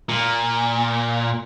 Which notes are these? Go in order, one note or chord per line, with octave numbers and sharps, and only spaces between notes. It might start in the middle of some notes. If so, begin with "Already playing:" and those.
A#2